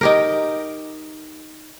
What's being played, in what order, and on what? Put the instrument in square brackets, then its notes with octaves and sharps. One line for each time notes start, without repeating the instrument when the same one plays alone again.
[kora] D#4 G4 A#4